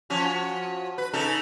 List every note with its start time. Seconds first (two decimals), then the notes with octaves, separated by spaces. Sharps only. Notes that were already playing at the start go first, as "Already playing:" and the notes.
0.10 F3 C#4 F#4
0.98 B4
1.13 C#3 D#4 A4